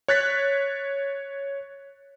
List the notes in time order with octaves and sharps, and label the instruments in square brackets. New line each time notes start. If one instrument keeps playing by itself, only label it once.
[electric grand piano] C#5 F#6 A6 B6